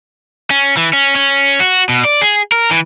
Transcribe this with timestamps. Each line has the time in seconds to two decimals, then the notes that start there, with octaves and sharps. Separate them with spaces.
0.50 C#4
0.77 E3
0.93 C#4
1.16 C#4
1.60 F#4
1.89 B2
2.04 D5
2.21 G#4
2.52 A#4
2.71 E3